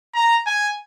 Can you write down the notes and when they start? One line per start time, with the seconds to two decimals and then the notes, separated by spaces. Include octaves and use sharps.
0.14 A#5
0.46 G#5